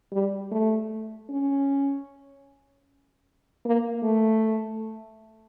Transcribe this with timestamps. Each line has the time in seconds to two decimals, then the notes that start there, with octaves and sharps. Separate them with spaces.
0.12 G3
0.51 A3
1.30 C#4
3.65 A#3
4.03 A3